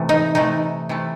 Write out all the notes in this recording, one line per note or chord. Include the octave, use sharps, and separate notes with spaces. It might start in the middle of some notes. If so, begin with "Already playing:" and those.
Already playing: C3 E3 A3
D#4
C3 E3 A3 D#4
C3 E3 A3